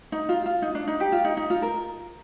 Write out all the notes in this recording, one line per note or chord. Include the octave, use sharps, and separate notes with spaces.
D#4
F4
F4
D#4
D4
D#4
G4
F4
D#4
D#4
F4
A#4